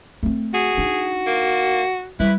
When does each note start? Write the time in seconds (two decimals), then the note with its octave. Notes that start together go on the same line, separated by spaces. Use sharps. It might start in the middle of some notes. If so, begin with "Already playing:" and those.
0.23 A3 C4
0.54 F#4 G#4
0.77 D4 D#4
1.26 A#3
2.20 G3 E4 B4